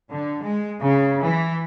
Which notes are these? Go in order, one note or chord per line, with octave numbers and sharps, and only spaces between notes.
D3
G#3
C#3
E3